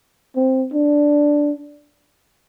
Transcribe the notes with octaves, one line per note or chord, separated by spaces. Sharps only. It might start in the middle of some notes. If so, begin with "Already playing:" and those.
C4
D4